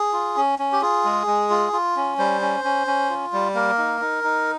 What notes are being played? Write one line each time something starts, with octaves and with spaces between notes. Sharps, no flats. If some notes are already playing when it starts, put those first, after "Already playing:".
Already playing: G#4
F4
C#4
C#4
G4
F4 G#4
G#3
G#3
F4
F4
C#4
G3 C5
C#4
C#4
C#4
F4
G3
A#3 A#4
D#4
D#4
D#4